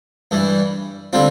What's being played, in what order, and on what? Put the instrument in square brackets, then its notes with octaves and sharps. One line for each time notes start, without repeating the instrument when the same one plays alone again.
[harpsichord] G2 E3 G3
D3 G3 C4 F4